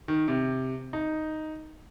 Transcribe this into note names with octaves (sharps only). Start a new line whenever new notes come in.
D#3
C3
D#4